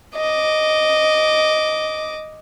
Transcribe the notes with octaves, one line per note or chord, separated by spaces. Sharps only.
D#5 D6